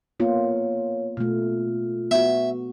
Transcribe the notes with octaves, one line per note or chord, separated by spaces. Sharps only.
A#3 B3 F4 C#5
B2 A3 F4
B3 F#4 E5